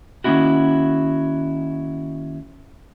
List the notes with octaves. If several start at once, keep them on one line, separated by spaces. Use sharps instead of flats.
D#3 G#3 A#3 C#4 E4 F#4